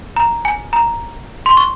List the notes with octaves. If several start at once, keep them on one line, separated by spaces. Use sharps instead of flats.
A#5
G#5
A#5
C6
C#6